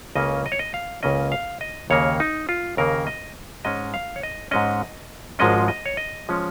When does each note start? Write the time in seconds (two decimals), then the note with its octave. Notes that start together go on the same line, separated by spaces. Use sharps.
0.15 C#2 C#3 A#3 C#4 D#5
0.46 D#5
0.52 C#5
0.59 D#5
0.74 F5
1.03 C#2 C#3 A#3 C#4 D#5
1.32 F5
1.61 D#5
1.90 D#2 C#3 A#3 C#5
2.20 D#4
2.49 F4
2.77 D#2 C#3 A#3 A#4
3.07 D#5
3.65 G#2 G#3 C#4 D#5
3.94 F5
4.16 C#5
4.23 D#5
4.51 G#2 G#3 C#4 D#5
5.39 G#1 G#2 F3 G#3 C#4 D#5
5.68 D#5
5.86 C#5
5.97 D#5
6.29 F3 G#3 C#4